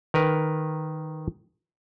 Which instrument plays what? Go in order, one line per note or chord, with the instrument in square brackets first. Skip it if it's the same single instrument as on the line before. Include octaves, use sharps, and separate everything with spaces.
[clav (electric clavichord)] D#3 A#4 B4